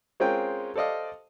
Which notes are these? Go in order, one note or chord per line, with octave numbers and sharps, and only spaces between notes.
G#3 C4 C#4 F4 A#4 G5
A4 C5 D5 D#5 F5